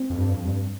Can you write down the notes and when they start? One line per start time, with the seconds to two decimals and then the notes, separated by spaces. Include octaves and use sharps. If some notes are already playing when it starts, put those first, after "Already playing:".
Already playing: C4
0.10 F2
0.17 G2
0.31 F2
0.45 G2